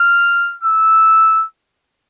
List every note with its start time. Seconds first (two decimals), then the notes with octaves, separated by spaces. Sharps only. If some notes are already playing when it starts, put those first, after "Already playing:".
Already playing: F6
0.63 E6